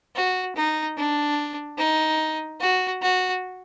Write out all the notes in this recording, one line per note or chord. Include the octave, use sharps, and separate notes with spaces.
F#4
D#4
D4
D#4
F#4
F#4